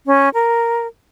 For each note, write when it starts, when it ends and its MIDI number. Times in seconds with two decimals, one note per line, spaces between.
0.07 0.29 61
0.34 0.87 70